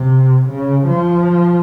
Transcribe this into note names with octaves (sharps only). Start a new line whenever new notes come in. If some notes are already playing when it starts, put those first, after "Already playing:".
Already playing: C3
C#3
F3